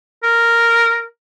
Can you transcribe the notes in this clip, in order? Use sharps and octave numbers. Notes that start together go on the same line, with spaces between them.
A#4